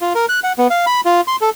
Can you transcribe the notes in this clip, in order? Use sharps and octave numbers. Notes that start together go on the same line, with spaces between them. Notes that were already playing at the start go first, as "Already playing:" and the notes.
F4
A#4
F#6
F#5
B3
F5
B5
F4
C6
A4